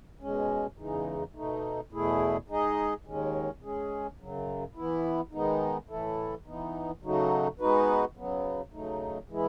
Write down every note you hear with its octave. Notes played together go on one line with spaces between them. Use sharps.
B2 G#3 C#4
E2 C#3 E3 G#3 D#4
B2 A3 D#4
E2 B2 A3 E4 G#4
G#3 D#4 G#4 D#5
D#2 D#3 G#3 C#4
G#3 C#4 G#4
F#2 C#3 F#3
E3 B3 E4
D#3 G#3 B3 D#4
A2 E3 A3 E4 A4
E3 B3 D#4
C#3 F#3 A3 D#4 F#4
G#3 B3 D#4 F#4 B4
C#3 F#3 B3
C#3 F#3 A3 D#4
E3 G#3 B3 E4